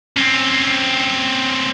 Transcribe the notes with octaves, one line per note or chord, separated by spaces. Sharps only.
C4 C#4